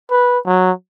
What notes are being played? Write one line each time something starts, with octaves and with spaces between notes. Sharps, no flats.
B4
F#3